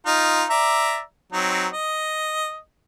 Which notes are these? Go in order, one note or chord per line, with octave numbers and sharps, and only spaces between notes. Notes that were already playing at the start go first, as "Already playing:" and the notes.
D#4 F4
D5 E5 A#5
F#3 C4 D#4
D#5